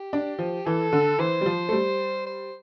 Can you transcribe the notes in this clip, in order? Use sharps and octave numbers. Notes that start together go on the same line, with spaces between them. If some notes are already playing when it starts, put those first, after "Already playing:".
Already playing: G4
D4
F3
E3 A4
D3
E3 C5
G3
F3
A3
G3
C5